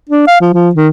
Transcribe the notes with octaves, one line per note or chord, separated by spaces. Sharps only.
D4
F5
F3
F3
D#3